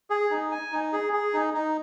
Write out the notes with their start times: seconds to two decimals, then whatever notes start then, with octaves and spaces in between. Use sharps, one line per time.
0.10 G#4
0.31 D#4
0.51 G#5
0.72 D#4
0.93 G#4
1.13 G#4
1.33 D#4
1.54 D#4